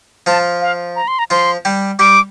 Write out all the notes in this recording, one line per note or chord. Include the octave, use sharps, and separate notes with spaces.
F3 F4 A5
F5
A#5
C6
A#5
F3 F4 C6
G3 G4
G3 G4 D6